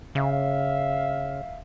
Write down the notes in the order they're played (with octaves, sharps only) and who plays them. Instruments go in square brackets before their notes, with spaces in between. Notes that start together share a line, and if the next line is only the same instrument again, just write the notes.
[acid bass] C#3 [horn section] E5 F5